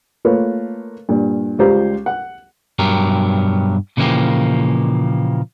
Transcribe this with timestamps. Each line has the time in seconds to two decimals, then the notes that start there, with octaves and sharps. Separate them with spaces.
0.25 A3 A#3 F4 B4 C#5
1.09 G2 A#2
1.59 C#2 G3 F4 G4 C5 A#5
2.06 F#5
2.79 G2 B2 F#3 G4 A#4
3.97 A#2 C#3 E3 F3 A#3 G4